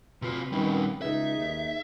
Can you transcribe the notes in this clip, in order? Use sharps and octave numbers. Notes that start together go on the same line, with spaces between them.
C3 C4 F4 F#4 B4
D#3 G3 C#4
C#2 D#4 G#4 B4 E5
D#2